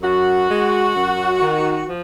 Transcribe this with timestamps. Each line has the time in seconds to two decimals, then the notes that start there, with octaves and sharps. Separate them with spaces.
0.02 F#2 F#4
0.49 G#3
0.96 F#2
1.42 D#3
1.88 F3